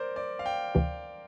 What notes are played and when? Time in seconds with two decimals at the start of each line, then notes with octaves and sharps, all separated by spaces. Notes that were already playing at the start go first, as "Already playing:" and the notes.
Already playing: A#4 C5 D5
0.16 D5
0.39 F5
0.46 G5
0.75 D2 C3 E3